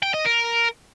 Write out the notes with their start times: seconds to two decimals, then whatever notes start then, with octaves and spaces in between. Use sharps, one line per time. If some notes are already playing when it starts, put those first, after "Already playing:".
0.03 G5
0.14 D#5
0.25 A#4